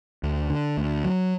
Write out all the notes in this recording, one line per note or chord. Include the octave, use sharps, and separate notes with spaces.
D2
D3
D2
F#3